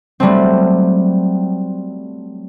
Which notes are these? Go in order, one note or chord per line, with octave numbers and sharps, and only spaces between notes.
F#3 G3 A3 C4